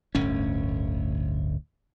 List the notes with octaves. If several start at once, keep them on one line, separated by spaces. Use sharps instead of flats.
D1 G1 D2 C#4